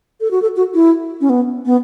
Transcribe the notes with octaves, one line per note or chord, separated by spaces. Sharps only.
A4
F#4
A4
F#4
E4
C#4
B3
B3